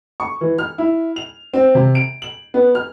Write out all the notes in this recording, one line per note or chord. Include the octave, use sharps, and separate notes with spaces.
C#6
E3
F6
E4
F7
C4
C3
D7
F#7
B3
F6